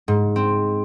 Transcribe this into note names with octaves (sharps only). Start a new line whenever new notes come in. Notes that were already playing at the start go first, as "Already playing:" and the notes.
G#2
C4